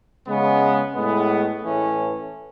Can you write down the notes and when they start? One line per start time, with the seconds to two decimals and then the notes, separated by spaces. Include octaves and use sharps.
0.28 C#3 G#3 B3
0.94 A2 G#3 B3
1.63 A2 E3 A3 C#4